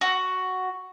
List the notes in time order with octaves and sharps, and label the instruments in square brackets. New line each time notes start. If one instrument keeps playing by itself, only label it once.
[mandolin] F#4